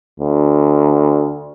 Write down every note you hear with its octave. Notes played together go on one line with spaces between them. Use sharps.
D2